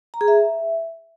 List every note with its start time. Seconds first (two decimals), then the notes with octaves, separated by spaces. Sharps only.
0.14 A#5
0.21 G#4
0.28 E5